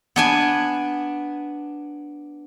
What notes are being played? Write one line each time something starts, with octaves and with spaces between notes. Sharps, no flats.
B3 D4 G#5